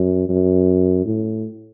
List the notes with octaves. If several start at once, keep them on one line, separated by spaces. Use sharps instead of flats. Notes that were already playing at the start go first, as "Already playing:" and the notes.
Already playing: F#2
F#2
A2